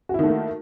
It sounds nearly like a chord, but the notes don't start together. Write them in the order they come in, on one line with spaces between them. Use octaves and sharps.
F#4 E4 D#3 A3 A#3